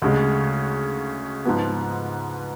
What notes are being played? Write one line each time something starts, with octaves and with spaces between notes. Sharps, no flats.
D2 C#3 G#3
G#2 F3 B3